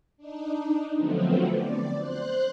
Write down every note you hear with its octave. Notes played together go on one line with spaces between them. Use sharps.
D4 D#4
D3 F3 F#3 A3 B3 C4
D5
C5 F#6